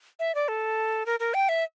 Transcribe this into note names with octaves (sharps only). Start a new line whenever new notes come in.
E5
D5
A4
A#4
A#4
G5
E5